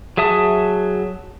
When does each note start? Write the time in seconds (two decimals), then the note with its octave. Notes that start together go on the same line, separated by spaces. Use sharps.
0.17 F#3 G#4 E5 A5 D#6